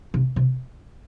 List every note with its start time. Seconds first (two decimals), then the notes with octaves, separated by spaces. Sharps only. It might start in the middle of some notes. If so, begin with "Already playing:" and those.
0.14 C3
0.36 C3